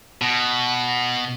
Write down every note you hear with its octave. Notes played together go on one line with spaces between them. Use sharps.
B2